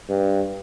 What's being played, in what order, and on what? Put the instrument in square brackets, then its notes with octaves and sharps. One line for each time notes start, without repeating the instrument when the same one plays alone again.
[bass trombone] G2